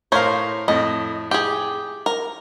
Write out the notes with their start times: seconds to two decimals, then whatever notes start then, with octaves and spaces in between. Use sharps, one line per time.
0.12 A2 A#4 C5 C#5 F5
0.68 F2 A2 D#5
1.31 G4 G#4
2.06 A#4